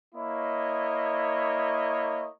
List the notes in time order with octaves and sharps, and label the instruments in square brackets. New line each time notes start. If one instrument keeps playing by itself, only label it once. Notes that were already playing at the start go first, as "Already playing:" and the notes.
[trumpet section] A#3 E4 C#5 D#5